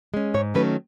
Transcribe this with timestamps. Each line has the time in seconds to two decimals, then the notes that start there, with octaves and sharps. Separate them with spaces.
0.14 G#3 C#4
0.34 G#2 C#5
0.54 D#3 F#3 A3 C#4 B4